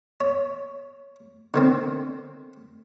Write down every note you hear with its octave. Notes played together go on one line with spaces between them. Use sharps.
C#5
D3 D#3 C4